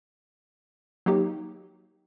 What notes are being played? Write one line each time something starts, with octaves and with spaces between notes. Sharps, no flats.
F#3 A#3 D#4 G4